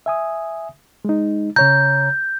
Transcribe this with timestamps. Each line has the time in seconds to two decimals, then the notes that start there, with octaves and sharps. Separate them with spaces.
0.06 E5 G#5 D#6
1.05 G#3 D#4
1.56 C#3 C#5 A#5 G6